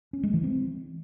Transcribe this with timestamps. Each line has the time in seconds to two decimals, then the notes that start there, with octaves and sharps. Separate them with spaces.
0.13 C#4
0.23 G#3
0.34 E3
0.44 C4